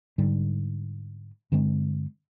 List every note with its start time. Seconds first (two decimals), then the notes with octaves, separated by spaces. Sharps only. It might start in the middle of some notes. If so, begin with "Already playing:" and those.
0.18 G#2 D3 G3
1.52 G2 D3 G#3 C4